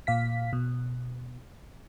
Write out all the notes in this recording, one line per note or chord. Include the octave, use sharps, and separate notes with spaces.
A#2 F5 B6
B2